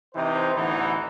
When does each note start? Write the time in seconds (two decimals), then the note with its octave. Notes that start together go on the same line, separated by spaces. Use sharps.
0.14 C3 E3 D#4 C5
0.53 A1 D2 E3 B3 D#4 B4